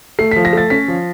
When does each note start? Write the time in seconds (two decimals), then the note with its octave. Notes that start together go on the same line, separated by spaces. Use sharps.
0.19 A3 C7
0.31 B6
0.36 F3
0.45 A#6
0.53 A3 A6
0.70 C#4 B6
0.88 F3